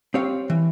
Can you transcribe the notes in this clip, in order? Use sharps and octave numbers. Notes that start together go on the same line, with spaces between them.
C4 G4 C#5 F5
E3